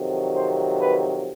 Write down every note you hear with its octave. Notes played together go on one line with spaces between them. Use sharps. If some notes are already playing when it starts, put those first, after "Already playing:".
Already playing: F2 C3 D#3 F#3
C5
B4